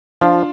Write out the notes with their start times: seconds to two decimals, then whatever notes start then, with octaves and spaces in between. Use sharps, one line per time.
0.21 F3 D4 F4